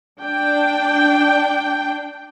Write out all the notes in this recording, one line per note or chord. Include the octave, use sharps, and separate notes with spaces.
D4 G5